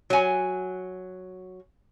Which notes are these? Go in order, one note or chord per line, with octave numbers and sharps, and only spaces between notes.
F#3 G#5